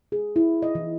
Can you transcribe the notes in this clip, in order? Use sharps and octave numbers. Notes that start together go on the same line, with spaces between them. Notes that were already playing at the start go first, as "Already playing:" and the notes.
G#4
E4
D#5
E3